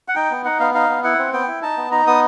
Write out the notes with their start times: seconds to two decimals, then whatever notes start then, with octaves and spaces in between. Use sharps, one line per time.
0.08 F#5
0.15 D#4 G5
0.31 B3
0.45 D#4 F#5
0.60 B3 F5
0.74 D#4 F5
0.89 B3
1.04 E4 F#5
1.19 C4
1.33 B3 G5
1.48 E4
1.62 D#4 A5
1.77 B3
1.91 D#4 A#5
2.07 B3 D#6